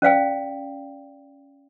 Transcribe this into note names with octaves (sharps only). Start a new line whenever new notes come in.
C#4 D5 F5 G5